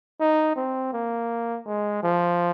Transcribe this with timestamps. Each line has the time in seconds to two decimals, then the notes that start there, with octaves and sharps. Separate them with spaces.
0.20 D#4
0.56 C4
0.93 A#3
1.67 G#3
2.03 F3